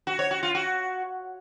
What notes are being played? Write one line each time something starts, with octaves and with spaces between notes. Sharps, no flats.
F#4
C#5
F#4
F4
F#4